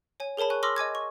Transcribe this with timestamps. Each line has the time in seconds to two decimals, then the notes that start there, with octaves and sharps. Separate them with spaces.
0.20 C#5 G#5
0.37 G#4 A#4 C#5 A5 B5
0.50 G#5 C#6 F#6
0.63 B5 C6 D6 E6 F6 A#6
0.76 D#5 G#5 D6 G#6
0.95 C#6